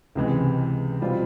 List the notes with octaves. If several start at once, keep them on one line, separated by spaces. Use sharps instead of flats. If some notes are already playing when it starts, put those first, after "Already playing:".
C#2 C3 E3 G#3
B2 G3 C4 F4